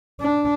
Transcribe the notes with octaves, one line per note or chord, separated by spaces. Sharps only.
D4